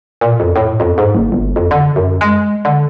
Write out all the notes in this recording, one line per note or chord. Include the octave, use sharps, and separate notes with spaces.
A#2
F2
A2
F2
G#2
F#1
G1
F2
D3
F#2
G#3
D3